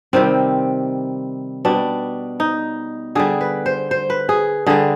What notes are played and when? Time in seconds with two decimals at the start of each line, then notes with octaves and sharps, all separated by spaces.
0.13 C3 D#3 G3 C4
1.65 B2 G3 D4
2.40 D#4
3.15 D3 G3 G#4
3.41 B4
3.66 C5
3.91 C5
4.10 B4
4.29 G#4
4.67 D3 G3 G#4